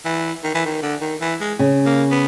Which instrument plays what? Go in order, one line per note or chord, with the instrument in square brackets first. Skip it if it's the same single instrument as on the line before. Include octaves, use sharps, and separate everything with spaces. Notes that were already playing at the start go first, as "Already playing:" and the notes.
[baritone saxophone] E3
D#3
E3
D#3
D3
D#3
E3
G#3
[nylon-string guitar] C#3
[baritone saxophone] A#3
B3